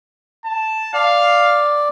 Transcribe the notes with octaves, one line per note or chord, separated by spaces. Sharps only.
A5
D5 F5